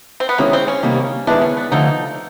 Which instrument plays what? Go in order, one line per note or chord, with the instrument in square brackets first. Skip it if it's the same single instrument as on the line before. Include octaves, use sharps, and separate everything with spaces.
[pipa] C4
B3
[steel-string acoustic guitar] D#3 G#3 C#4 E4 G#4 [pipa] A#3
[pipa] C4
C#4
[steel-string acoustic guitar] C3 D#3 G3 A#3
[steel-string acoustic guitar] D#3 G#3 B3 E4 [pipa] D4
[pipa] C#4
B3
[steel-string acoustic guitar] D3 F3 A3 [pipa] D#4